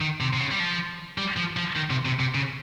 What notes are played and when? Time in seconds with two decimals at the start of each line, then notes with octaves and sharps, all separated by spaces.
0.01 D#3
0.21 C3
0.33 C3
0.40 C#3
0.51 G3
0.60 F3
1.18 G3
1.37 F3
1.57 F3
1.76 D#3
1.90 C3
2.05 C3
2.20 C3
2.35 C#3